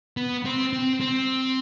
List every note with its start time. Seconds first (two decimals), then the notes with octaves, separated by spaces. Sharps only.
0.17 B3
0.45 C4
0.73 C4
1.01 C4